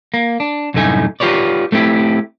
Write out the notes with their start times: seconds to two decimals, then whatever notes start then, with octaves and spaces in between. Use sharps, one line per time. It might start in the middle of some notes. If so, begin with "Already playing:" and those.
0.14 A#3
0.40 D4
0.74 C2 F#2 A2 A3 D#4 G#5
1.20 F4 G4 B4 C#5 D5
1.72 A3 C4 E4 G4